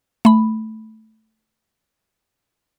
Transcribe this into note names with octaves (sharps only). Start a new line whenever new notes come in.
A3 B5